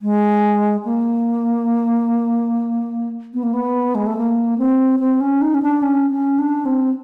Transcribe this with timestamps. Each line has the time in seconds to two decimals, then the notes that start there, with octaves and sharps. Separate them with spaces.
0.02 G#3
0.85 A#3
3.33 B3
3.43 A#3
3.53 B3
3.95 G#3
4.06 A3
4.17 A#3
4.58 C4
4.99 C4
5.20 C#4
5.41 D#4
5.54 C#4
5.62 D4
5.82 C#4
6.11 C#4
6.38 D4
6.65 C4